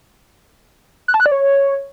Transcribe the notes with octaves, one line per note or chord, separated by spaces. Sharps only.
F#6
A5
F#6
D5
C#5